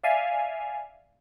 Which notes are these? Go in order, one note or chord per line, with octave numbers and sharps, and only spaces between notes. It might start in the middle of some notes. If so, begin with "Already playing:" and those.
D5 E5 F5 G#5